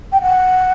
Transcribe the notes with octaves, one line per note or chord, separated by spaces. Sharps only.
G5
F#5